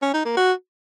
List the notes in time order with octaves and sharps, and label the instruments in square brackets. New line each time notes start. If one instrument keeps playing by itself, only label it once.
[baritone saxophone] C#4
D#4
A#3
F#4